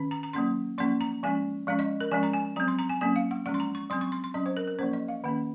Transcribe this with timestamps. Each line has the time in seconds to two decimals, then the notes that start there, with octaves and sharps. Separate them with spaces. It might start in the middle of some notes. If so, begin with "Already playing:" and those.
Already playing: D#3 C#4
0.11 A#5
0.23 A#5
0.33 F#3 A#3 C#4 C6
0.78 F3 A#3 C#4 C6
1.01 A#5
1.23 F3 G#3 C#4 G#5
1.67 F3 G#3 C#4 F5
1.79 D#5
2.00 A#4
2.11 F3 G#3 C#4 G#5
2.23 A#5
2.33 G#5
2.56 F#3 C4 A#5
2.68 C6
2.79 A#5
2.89 G#5
3.01 F#3 A#3 C#4 G#5
3.16 F5
3.31 F#5
3.46 F3 G#3 C#4 F#5
3.54 C6
3.60 A#5
3.75 C#6
3.90 F#3 C4 C6
4.01 C#6
4.12 C6
4.24 C6
4.34 F#3 C#4 D#5
4.46 C5
4.57 A#4
4.67 A#4
4.78 F3 A#3 C#4 C5
4.93 D#5
5.08 F5
5.24 D#3 A#3 C#4 F#5